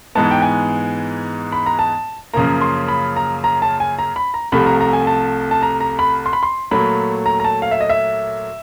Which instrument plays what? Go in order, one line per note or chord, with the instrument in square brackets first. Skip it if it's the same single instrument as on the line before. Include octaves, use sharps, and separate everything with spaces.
[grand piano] G#2 E3 G#3 B3 A5
G5
G#5
B5
A#5
A5
F#2 C#3 F3 A#3 A#5
C6
B5
A#5
A#5
A5
G#5
A#5
B5
A#5
C2 C3 F3 A3 B5
A#5
A#5
G#5
A5
A5
A#5
A#5
B5
C6
B5
C6
A#2 F#3 A3 B5
A#5
A#5
A5
F5
E5
D#5
E5